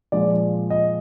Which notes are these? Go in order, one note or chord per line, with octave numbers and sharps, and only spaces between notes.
A#2 F3 G#3 D5
D#5